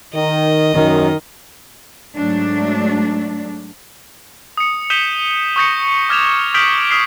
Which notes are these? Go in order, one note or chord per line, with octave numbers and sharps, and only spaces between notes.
D#3 D#5
F#2 D#3
G#2 F#3 A3 D4
D#6 C#7
D#6 G6 B6 D#7 E7 G7
C#6 D#6 G6 A#6 C#7
D6 F6 G#6 A#6 E7 F7
D#6 F6 G6 B6 D7 F#7
D#6 F6 B6 C7